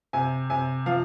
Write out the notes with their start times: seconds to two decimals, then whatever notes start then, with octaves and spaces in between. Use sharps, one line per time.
0.13 C3 G#5
0.50 C3 G#5
0.86 F3 F5